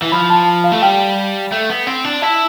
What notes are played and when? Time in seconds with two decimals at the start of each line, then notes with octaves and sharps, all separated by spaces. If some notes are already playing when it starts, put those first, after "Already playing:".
0.02 E3
0.12 F3 B5
0.30 A5
0.64 F5
0.72 A3
0.82 G3 G5
1.52 A3
1.70 B3
1.87 C4
2.05 D4
2.22 E4 A5